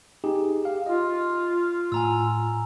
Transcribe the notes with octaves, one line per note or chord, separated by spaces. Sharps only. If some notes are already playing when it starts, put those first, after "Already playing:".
D#4 G4 G#4
G4 F5
F4 D#5
A2 G#5 A#5 E6